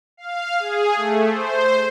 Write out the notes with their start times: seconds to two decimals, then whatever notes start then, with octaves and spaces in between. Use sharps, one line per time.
0.17 F5
0.60 G#4
0.96 A3
1.29 C5